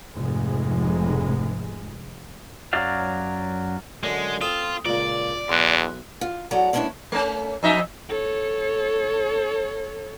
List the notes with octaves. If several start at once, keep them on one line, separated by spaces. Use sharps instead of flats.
F1 G#2 G#3
F#2 F#3 F#4 D5 F5
F#2 D3 G#3
C4 F4 A4 A5 D#6
C#2 A#2 F4 D5 D7 F#7
B1 E2 C6 F#6
F4
E2 F#3 A4 D5 F#5 A#5
G#3 A#3 B3 C#4 D4 E4
A3 C#4
F2 D#4 E5
A4 C#5